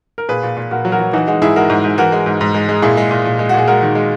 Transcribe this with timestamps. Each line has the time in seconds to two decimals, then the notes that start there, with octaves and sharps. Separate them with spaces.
0.18 A#4
0.29 A#2 G#4 B4
0.43 A#2
0.57 A#2
0.71 A#2 F#4 A#4
0.85 F#3
0.92 F#4 A#4
0.99 F#3
1.13 E3 D#4 F#4
1.28 G#3 D#4 F#4
1.41 G#2 E4 G#4
1.56 G#3 F#4 A#4
1.70 G#2
1.84 G#2
1.98 E3 F#4 A#4
2.12 G#3
2.26 G#2
2.41 G#2
2.54 G#3
2.69 G#3
2.82 A#2 E4 G#4
2.97 G#3
3.11 A#2
3.25 A#2
3.39 G#3
3.49 F#4
3.54 A#2 G#4
3.68 G#3 F#4 A#4
3.82 D#3
3.95 G#3